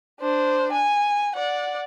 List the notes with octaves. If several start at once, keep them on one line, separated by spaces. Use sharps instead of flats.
D4 C5
G#5
D5 F#5